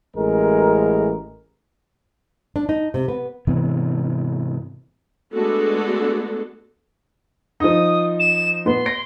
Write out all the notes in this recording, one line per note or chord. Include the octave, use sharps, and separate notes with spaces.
A1 G#3 A#4
D4
D#4
C3
B3
G#2 C3 E3 B3
G#3 A3 B3 D4 F#4 A4
F3 D#4 D#6
E7
A#2 B3 C6
A#6 C7 D7